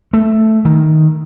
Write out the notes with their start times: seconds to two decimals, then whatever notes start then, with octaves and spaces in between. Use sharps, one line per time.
0.13 A3
0.65 D#3